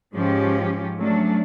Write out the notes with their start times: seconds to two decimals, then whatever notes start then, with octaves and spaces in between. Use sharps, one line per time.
0.13 G#2 F3 C#4 G4
0.97 F#3 A3 C#4 D4